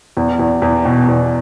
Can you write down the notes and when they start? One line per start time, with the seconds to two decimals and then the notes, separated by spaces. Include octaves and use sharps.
0.17 E2
0.39 E2
0.62 E2
0.85 B2
1.08 E2